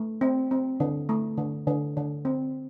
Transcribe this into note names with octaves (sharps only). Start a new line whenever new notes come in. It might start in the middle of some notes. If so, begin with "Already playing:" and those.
Already playing: A3
C4
C4
D3
A3
D3
D3
D3
C4